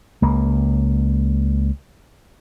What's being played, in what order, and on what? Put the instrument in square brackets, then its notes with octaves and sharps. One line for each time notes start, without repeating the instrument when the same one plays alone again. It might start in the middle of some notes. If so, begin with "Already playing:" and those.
[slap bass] C#2 A#3